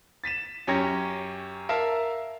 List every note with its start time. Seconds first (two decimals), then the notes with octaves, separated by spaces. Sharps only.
0.24 A6 B6 D#7 E7
0.67 F#2 C#4 G4 C#5 G#6 A#6
1.69 A#4 E5 F5 A5 A#5